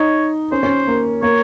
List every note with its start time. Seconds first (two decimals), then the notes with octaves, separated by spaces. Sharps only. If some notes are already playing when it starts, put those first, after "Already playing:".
Already playing: D#4 C#5
0.52 C#4 C5
0.63 C#4
0.88 A#3
1.23 A#3 C#5